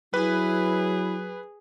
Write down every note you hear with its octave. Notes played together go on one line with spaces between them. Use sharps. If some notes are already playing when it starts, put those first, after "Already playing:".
F#3 E4 G#4 B4